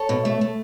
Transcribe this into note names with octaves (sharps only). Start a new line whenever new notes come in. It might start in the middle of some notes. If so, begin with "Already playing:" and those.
Already playing: A4 C#5
B2
A3
A3